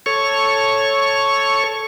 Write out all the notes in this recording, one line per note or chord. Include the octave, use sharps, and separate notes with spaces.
A4 C#5 C#6